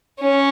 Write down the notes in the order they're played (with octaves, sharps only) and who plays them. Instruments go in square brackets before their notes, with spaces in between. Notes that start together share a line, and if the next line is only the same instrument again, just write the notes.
[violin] C#4